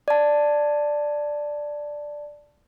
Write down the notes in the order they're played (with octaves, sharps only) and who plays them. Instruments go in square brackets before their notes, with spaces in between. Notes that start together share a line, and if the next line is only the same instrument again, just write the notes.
[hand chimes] D5 A5